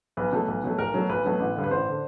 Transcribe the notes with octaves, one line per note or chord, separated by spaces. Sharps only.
B1 B4
B2 F#3 A3
B1
B2 F#3 A3
B1 A#4
B2 F#3 A3
B1 B4
B2 F#3 A3
A1
G2 D3
B4
A1 C5
D3